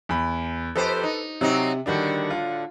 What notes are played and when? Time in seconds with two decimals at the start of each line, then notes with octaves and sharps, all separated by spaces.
0.09 E2 B5
0.76 F2 G4 A4 B4 C5
1.03 D#4
1.41 C3 F#3 C4 D#4
1.86 A2 D3 D#3 G3 D4 F#4
2.30 F4